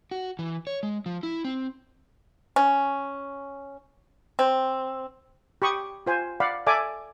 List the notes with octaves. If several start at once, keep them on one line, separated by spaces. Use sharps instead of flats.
F#4
E3
C#5
G#3
F3
E4
C4
C#4
C4
G4 B5 C#6 D#6
F4 C5 G#5
D5 F5 F#5 B5
A4 D5 E5 G#5 D6